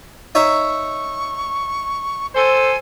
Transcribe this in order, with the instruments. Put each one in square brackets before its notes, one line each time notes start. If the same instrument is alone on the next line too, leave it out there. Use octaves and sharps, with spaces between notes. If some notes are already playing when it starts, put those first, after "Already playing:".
[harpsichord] D#4 C#5 E5 [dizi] C#6
[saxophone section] A4 C5 [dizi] G#5